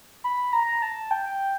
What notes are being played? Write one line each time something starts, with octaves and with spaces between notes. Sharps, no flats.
B5
A#5
A5
G5